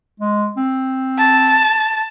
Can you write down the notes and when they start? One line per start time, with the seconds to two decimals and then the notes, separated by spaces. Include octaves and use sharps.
0.20 G#3
0.57 C4
1.19 A5